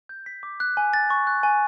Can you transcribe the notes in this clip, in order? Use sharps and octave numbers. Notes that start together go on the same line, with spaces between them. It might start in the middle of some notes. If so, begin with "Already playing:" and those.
G6
B6
D6
F#6
G#5
A6
C#6
F#6
G#5